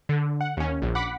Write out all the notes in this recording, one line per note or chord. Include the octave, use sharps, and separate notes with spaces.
D3
F#5
D#2 C#4
A#1
F#5 B5 D6 B6